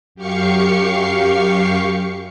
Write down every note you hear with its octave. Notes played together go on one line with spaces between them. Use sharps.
F#2 G4 F5 C#6 C7 C#7